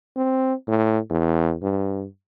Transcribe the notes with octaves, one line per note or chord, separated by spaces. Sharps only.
C4
A2
E2
G2